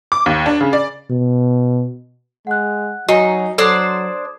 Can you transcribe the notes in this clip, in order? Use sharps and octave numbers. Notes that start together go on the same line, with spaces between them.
D6
D#2
D4
C#3
D5
B2
G#3 F#5 F#6
F#3 D#4 F#4 G#5 C7
F#3 D4 A4 C5 D5 D6 D#6 G#6